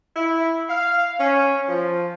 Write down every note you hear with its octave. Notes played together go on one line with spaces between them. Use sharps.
E4
F5
C#4
F3